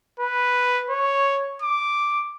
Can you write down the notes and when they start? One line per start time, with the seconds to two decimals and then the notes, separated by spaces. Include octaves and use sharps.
0.20 B4
0.90 C#5
1.62 D6